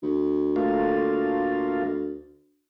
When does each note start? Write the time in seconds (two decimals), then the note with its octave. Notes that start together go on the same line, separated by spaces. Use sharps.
0.03 D2
0.56 A3 A#3 F4